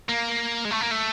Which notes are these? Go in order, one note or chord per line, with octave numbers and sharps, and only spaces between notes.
A#3
G#3
A3
A#3
A3